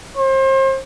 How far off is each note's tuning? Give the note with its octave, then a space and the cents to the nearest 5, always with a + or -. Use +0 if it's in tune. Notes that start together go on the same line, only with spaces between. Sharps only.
C5 +35